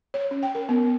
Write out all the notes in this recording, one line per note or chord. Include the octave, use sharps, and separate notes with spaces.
C#5
C#4
G5
A#4
B3